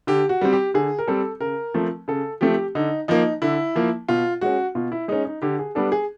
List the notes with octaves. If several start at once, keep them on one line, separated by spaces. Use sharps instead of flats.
D3 G4
F#4
G3 C4
G4
D3 G#4
A#4
G3 C4 A4
C#3 A#4
F3 A3 C4
C#3 A4
F3 A3 C4 G4
D3 D#4
F3 A#3 D#4
D3 E4
F3 A#3
B2 F4
G#3 C#4 F#4
B2 F4
E4
G#3 C#4 D#4
D#4
D3 G4
G#4
G3 B3 D4 A4
G#4